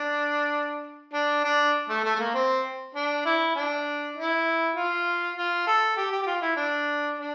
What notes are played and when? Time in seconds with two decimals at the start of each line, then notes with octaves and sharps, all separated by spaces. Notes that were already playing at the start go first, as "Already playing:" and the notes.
Already playing: D4
1.14 D4
1.44 D4
1.89 A3
2.04 A3
2.15 A3
2.19 A#3
2.34 C4
2.95 D4
3.25 E4
3.56 D4
4.16 E4
4.76 F4
5.37 F4
5.67 A4
5.97 G4
6.11 G4
6.22 G4
6.26 F4
6.42 E4
6.56 D4
7.17 D4